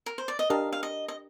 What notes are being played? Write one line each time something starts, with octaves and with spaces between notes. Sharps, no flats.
A#4
C5
D5
D#5
D4 G4 A#4 D#5 F5 A5
F5
D#5
D#5